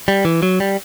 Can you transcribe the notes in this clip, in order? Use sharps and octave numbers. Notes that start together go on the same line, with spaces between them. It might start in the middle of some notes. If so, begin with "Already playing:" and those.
G3
E3
F#3
G3